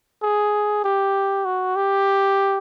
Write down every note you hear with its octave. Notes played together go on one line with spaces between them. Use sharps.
G#4
G4
F#4
G4